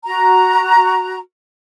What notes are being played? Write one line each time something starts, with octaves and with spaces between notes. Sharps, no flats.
F#4 A#5